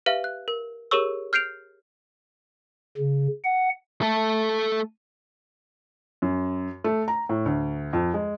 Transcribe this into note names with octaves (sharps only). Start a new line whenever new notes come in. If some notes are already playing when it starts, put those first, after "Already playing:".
G4 B4 E5 F5
F#6
A#4
G4 G#4 A#4 C#5 C#6 E6
F6 G6 C7 D7 F7
C#3
F#5
A3 A4
F#2
A3
A#5
A2
D2
F2
G#3